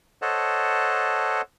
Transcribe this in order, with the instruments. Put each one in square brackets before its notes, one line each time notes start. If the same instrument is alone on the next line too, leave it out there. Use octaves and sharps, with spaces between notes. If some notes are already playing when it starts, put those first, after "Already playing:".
[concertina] A4 C5 C#5 D#5 F#5 A5